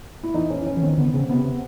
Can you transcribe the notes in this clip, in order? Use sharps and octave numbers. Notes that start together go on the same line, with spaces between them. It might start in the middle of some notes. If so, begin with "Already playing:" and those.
E4
E3 D#4
C#4
C#4
E3
D#3 C4
D3 B3
C#3 C4
C3 B3